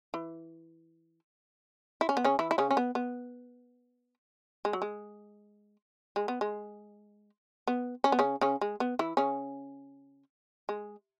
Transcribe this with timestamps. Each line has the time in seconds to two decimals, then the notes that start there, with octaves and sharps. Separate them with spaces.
0.14 E3
2.01 E4
2.09 C#4
2.17 B3
2.24 C#3 C#4
2.39 E3 E4
2.51 E4
2.58 C#3 C#4
2.71 C#4
2.77 B3
2.95 B3
4.65 G#3
4.73 F#3
4.82 G#3
6.16 G#3
6.28 B3
6.41 G#3
7.68 B3
8.04 C#4
8.12 B3
8.19 C#3 C#4
8.41 C#3 C#4
8.61 G#3
8.80 B3
8.99 E3 E4
9.17 C#3 C#4
10.69 G#3